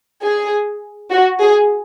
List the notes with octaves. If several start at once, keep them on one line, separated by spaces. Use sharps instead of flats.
G#4
F#4
G#4